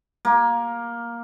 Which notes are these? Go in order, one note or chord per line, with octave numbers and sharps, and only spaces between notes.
A#3